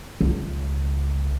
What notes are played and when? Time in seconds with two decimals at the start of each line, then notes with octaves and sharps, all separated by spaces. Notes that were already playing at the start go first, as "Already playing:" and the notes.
0.21 C#2